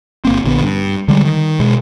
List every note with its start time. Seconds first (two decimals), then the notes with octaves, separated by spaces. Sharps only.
0.25 G1 A#3 C4
0.44 A#1 D3 B3
0.63 G2
1.08 D3 G3 G#3
1.25 D#3
1.60 B2 G#3